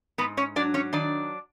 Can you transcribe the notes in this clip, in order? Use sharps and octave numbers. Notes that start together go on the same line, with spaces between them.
G#2 B3 B4
C#4 C#5
F#3 D4 D5
C#4 C#5
D#3 D4 D5